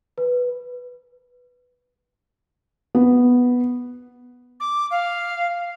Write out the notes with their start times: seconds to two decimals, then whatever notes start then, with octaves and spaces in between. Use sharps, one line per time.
0.18 B4
2.95 B3
4.60 D6
4.91 F5